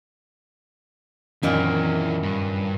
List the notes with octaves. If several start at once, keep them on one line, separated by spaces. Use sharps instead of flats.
F#2 A#2 D#3 E3 A#3 D5
G2